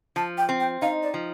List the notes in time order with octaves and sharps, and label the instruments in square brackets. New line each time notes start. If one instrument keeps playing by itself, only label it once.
[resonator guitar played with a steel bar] F3 [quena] A5
[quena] G5
[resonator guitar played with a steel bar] C4
[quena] G5
[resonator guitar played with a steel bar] D#4 [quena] F5
[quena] D5
[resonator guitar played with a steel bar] F3